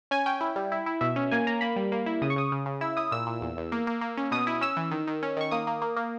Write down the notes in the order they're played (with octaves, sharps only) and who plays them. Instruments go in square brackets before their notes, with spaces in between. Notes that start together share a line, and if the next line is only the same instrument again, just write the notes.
[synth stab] C#4 G#5
C#4 G5
E4
G3
E4
E4
B2 E5
C#4
A#3 G#5
A#3 A#5
A#3 B5
G3
A#3
E4
C#3 D#6
C#6
C#3 D#6
C#3
C#3
E4 E6
E4 D#6
A#2 E6
A#2
E2
E2
A#3
A#3
A#3
C#4
B2 D#6
E4
C#4 E6
E3
D#3
D#3
C#4
D#3 C#6
A#3 D#6
A#3
A#3
A#3